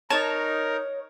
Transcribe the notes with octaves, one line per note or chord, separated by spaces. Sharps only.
D#4 A#4 C#5 A5